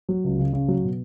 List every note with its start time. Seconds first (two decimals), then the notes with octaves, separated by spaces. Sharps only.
0.09 F#3
0.24 C#2
0.38 C#3
0.53 C#3
0.68 F#3
0.83 B2